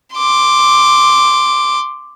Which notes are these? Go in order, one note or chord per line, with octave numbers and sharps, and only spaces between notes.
C6 D6